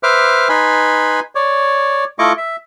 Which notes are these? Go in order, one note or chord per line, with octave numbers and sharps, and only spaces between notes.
B4 C5 E5 D6 F6
D#4 B4 G#5 B5 C6
C#5 D5
A3 E4 F4 D#5 C#6 D6
E5